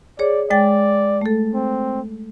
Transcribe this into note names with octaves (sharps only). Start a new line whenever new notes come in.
G#4 C#5 D5
G#3 D5 G5 A6
A3 A4
C4